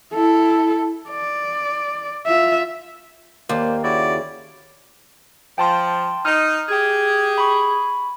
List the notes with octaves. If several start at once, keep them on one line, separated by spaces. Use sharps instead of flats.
E4 A4
D5
F4 E5
D#2 A#3 C5 D5
C#3 E4 F#4 D5
F3 G5 A5 C6
D#4 F6
G4 G#4
B5 C#6